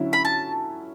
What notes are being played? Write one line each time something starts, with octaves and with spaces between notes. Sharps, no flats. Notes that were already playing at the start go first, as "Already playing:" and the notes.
Already playing: D3 F#3 C#4 E4
B5
A5